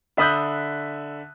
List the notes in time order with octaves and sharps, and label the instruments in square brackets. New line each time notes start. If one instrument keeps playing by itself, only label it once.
[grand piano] D3 E5 B5 D#6 F#6 G6